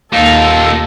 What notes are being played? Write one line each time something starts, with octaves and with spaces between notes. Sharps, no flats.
D#2 A#2 D#4 A4 F5